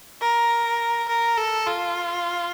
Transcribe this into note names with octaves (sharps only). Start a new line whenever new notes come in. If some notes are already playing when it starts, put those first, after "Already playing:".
A#4
A#4
A4
F4